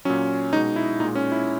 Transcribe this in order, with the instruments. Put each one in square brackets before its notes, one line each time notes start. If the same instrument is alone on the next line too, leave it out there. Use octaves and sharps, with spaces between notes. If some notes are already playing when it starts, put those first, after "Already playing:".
[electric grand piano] A#2 F#3 C#4
B2 G#3 D#4
E4
A#2 D#4
G#3
C#4
E4